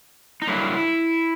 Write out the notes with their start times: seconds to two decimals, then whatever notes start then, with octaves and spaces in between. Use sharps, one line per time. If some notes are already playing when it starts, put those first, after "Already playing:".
0.42 D#4
0.47 G2 D3 F#3 A#3 E4